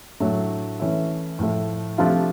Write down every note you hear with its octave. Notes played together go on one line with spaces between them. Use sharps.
A2 F#3 A3 D4
E3 A3 C#4 E4
A2 F3 A3
C3 F3 A3 D4 F4